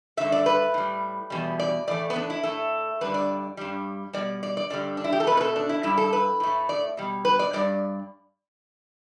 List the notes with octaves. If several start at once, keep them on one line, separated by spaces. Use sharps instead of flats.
G2 D3 A3 E5
D5
B4
A2 G3
E2 B2 G3
D5
A2 E3 A3 D5
B3
D4
E4
A2 A3 A4
G2 D3 G3 B4
D5
G2 G3
B2 G3 D5
D5
D5
G2 D3 G3 D5
D4
E4
G4
A4
B2 A3 B4
B4
A4
D4
E4
G2 G3 E4
A4
B4
A2 A3
D5
B2 G3
B4
D5
G2 G3 D5